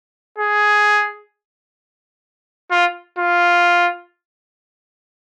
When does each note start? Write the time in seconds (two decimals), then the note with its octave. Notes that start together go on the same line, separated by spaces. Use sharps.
0.39 G#4
2.71 F4
3.19 F4